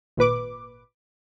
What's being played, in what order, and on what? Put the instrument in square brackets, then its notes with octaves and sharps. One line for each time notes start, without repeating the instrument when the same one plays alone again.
[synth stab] G#1 A#2 B4 D6